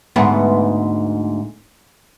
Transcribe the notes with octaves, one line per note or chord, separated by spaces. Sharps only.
D2 G#2 B3